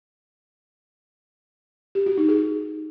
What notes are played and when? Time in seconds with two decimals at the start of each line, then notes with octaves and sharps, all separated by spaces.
1.95 G4
2.06 F#4
2.17 D#4
2.29 G#4